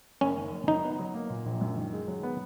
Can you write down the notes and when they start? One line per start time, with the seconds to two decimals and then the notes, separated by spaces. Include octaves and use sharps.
0.21 F#1 C#4
0.37 D#3
0.52 F#1
0.67 F#3 D#4
0.84 B3
0.99 F#3
1.14 A#3
1.30 A#2
1.46 A#1
1.61 F#2
1.76 D#3
1.93 G#3
2.08 F#3
2.23 B3